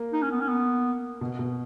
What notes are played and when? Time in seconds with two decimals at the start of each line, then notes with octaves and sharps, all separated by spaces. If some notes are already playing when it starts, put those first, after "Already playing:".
Already playing: A#3
0.13 D#4
0.22 C#4
0.31 B3
0.41 C#4
0.49 B3
1.21 B2
1.39 B2